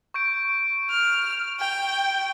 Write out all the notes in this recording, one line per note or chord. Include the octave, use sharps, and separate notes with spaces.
C#6 G6 D7
F6
G5